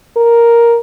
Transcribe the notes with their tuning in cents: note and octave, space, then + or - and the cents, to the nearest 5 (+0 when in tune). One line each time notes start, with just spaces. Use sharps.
A#4 +5